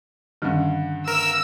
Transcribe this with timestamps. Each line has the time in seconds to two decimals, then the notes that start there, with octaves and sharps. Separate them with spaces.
0.42 G2 D3 D#3 C#4
1.08 A#4 E6